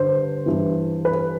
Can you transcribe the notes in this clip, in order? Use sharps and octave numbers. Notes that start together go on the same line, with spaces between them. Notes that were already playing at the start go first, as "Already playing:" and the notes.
Already playing: G2 D3 C5
G2 E3
B4